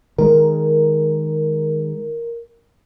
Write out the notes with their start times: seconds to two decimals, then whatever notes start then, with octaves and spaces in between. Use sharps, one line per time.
0.18 D#3 G#3 A#4